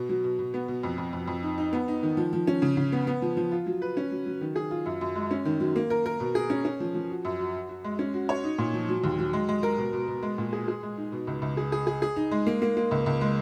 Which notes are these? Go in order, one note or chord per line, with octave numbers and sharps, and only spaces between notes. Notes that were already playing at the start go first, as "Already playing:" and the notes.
Already playing: B2
F#3
B2
B2
B3
B2
F2
F2
F2
F2
D#4
D#4
B3
D#4
D#3
F3
F3
C#4
C#3
C#3
B3
B3
F3
F3
F4
F#3
B4
C#4
F#3
F#3
D#3
G#4
F4
F#2
F#2
G#3
C#4
D#3
F#3
A#3
A#4
A#4
B2
G#4
C#4
C#4
F3
F3
F#4
F#2
F#4
F#4
F#4
G#3
C#4
F#4
C#5
D#4
A#2
F3
F#3
D#2
F#3
G#3
G#3
A#4
B2
B2
B2
G#3
A#2
G#4
G#4
G#3
D#4
B2
C#2
C#2
G#4
G#4
G#4
G#4
D#4
G#3
A#3
A#3
A#3
C#2
C#2
G#3